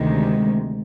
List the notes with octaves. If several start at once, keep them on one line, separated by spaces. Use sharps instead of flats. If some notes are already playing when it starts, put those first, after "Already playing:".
Already playing: D2 C3 D#3 G#3